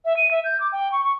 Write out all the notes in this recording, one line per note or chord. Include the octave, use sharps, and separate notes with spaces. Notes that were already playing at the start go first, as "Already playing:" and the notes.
E5
D#7
E5
G6
D6
G5
C#6
C#6